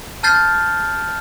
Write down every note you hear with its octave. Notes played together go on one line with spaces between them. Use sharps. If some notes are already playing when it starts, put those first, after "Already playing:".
A5 F6 G6 A6 C7